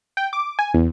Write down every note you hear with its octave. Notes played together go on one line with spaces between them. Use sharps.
G5
D6
G#5
E2